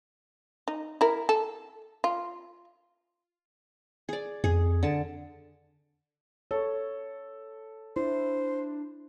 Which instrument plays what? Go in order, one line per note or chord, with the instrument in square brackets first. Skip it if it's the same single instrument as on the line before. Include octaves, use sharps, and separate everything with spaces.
[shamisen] D#4
E4 A#4
A4
F4
[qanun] G#4 D5
[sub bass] F2 [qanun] G#4
[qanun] D3 A5
[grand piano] A4 [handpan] C#5
[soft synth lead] D4 [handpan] E4 [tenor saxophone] C5